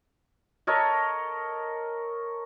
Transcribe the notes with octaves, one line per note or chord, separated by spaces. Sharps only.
A4 A#4 C#5 D#5